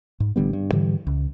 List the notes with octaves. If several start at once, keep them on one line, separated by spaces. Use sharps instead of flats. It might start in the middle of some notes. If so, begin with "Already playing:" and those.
G#2
A1 D3 G3 B3
G2
G#2 D3 E3 G3
C#2